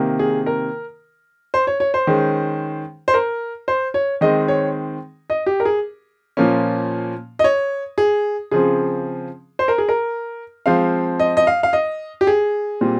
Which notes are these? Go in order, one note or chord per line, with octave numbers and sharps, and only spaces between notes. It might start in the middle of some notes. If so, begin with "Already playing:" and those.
Already playing: C3 D#3 A#3
G#4
A#4
C5
C#5
C#5
C5
D#3 G#3 C#4
C5
A#4
C5
C#5
D#3 G#3 C4 D#5
C#5
D#5
G4
A#4
G#4
A#2 F3 A#3 C#4
D#5
C#5
G#4
C#3 F3 C4 G#4
C5
A#4
G#4
A#4
F3 G#3 C4 F5
D#5
D#5
F5
F5
D#5
G4
G#4
A#2 G3 C4